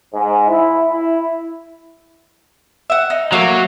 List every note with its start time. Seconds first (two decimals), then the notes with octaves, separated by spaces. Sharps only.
0.12 G#2
0.48 E4
0.91 E4
2.90 E5 F#5
3.10 D#4
3.32 F#3 A3 A#3 F#4